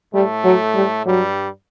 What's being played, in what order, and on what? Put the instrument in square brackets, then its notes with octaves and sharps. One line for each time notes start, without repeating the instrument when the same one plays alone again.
[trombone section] A2 A3 [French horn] G3
[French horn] F#3
G3
[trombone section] G2 G3 [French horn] F#3